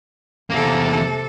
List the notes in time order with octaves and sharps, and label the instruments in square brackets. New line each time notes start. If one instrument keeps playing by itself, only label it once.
[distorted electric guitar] E2 A#3 [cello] C3 A4